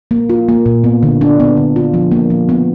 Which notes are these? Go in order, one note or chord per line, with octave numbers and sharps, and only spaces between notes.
A#3
F4
A#3
A#2
B3
D3
D4
B3
D3
F4
F3
A#3
F3
B3